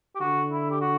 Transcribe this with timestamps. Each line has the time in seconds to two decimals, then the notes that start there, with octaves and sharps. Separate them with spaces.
0.15 G4
0.20 D3 F#4
0.51 E4
0.71 G4
0.81 F#4